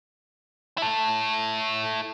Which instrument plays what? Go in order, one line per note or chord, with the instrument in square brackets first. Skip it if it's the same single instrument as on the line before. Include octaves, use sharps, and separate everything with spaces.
[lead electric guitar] E4 A4